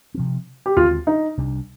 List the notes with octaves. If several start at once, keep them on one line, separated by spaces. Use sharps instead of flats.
C3 F3 C4
G4
D#2 D3 G#3 C4 F4
D#4
C2 C3 G3 D4